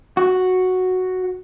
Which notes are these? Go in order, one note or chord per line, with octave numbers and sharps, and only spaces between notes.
F#4